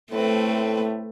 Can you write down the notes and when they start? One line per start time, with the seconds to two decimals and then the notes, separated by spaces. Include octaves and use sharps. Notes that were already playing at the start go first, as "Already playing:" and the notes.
0.12 A2 A3 C4 B4